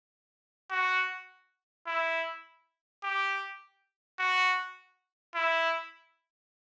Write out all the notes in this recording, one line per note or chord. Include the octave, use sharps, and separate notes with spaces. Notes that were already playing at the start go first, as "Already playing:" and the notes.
F#4
E4
G4
F#4
E4